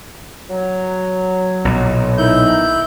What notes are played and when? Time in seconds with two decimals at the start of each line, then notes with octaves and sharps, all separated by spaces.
0.50 F#3
1.65 B1 A#2
2.18 D#3 E3 D#4 E4 G6